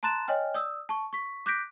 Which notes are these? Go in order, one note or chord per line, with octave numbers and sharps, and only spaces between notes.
A5 A#5 C6 F#6 A6 E7
C#5 D#5 G5 G#5 F6
D5 D#6 E6
A5 C#6
C#6 B6
D6 F#6 G6 A#6 B6 D7